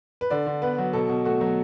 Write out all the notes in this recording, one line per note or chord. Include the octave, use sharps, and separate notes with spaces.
B4
D3 D5
D3
B3 B4
F#3
B2 A4
B2
A3 F#4
F#3